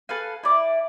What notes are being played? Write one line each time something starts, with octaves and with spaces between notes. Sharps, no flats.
A4 B4 F5 G#5
E4 D5